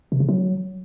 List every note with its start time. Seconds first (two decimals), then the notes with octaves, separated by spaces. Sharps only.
0.12 C3
0.20 C#3
0.29 F#3